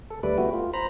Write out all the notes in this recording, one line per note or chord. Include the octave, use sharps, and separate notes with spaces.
A4
D2 G3 A3 B4 D5
A3 B3 E4 F#4 G4
F4
C5 A#5 B5